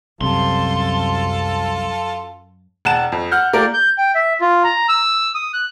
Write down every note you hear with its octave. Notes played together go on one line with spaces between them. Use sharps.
C2 F#2 C3 F4 A4 A5 C6
E1 F#5 A5 E7
F2
F#5 F6 G6
A3 A#3 F4 G4 A#4 D5
G6
G5
E5
F4
A#5
E6
D#6
F#6